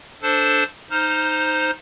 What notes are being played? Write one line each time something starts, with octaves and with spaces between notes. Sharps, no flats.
D4 A4 C5 A5
D#4 C5 F6